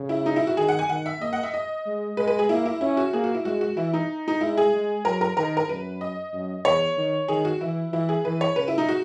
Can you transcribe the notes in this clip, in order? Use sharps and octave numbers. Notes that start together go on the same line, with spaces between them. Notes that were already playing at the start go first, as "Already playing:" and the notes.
Already playing: C#3
E4
D#4
E4
F#4
D#3 G#4
F#5
G#5
D#3 F#5
E5
A#3 D#5
F#5
E5
D#5
G#3
G#3 B4
B4
G#4
A#3 E4
E4
C#4 E4
F#4
A#3 G#4
F#4
E4
G#3 F#4
F#4
E3 E4
D#4
D#4
G#3 E4
G#4
G#3
F#3 A#4
A#4
D#3 A#4
A#4
F#2 B4
D#5
F#2
E2 C#5
D#3
D#3 G#4
F#4
E3 E4
E3 E4
G#4
E3 B4
C#5
C#3 B4
E4
D#4
F#4